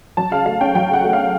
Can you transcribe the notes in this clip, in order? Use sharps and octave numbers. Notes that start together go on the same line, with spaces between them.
F#3 A5
C#3 F5
A3 F5
C#4 G5
F#3 G5
C#3 F#5
A3
F5
C#4